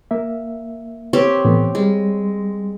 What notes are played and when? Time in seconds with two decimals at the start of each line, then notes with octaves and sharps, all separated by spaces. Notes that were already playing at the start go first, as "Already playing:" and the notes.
0.11 A#3 E5
1.13 C4 G4 C#5
1.45 A2 E3 B3
1.75 G3 G#3